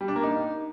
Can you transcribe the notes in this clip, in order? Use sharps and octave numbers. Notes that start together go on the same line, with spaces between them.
G3
D4
A#3
D#4